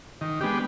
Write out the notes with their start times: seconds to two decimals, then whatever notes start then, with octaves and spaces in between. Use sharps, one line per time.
0.21 D#3
0.41 G#3 B3 D4 G4